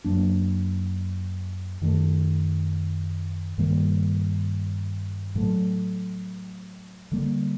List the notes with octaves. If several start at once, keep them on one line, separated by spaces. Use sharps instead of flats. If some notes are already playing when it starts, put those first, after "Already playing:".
F#2 F#3 A#3 D4
F#2 D#3 A3
G2 D#3 G3 A#3
A2 F#3 A3
D3 G3 A#3